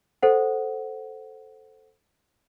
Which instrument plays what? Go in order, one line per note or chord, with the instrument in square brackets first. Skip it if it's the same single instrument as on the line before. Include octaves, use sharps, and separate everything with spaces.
[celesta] A4 C5 F#5